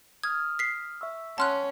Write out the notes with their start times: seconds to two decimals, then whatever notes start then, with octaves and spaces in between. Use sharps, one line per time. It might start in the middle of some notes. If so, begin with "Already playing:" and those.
0.23 D#6 F6 G#6
0.59 B6 C7
1.01 E5 C#6 E6
1.38 C#4 F#5 A5 C6 F6 F#6